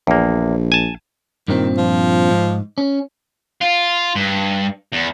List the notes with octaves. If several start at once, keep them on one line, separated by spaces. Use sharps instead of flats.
A#1 E2 A#3
G#5 A5
G2 A#2 D#3 C4
F3
G#2
C#4
F4
G2
E2